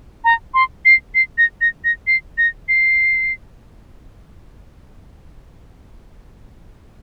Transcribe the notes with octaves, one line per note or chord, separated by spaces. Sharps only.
A#5
C6
C7
C7
A#6
A#6
A#6
C7
A#6
C7